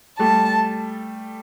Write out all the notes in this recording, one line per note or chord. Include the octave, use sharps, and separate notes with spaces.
G3 A3 A5